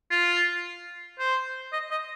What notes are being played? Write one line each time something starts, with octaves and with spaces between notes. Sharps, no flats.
F4
C5
D#5
D#5